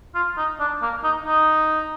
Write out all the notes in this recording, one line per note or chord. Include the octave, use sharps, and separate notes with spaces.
F4
D#4
D4
A#3
D#4
D#4